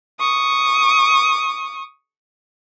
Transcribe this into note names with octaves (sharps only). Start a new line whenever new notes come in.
C#6 D#6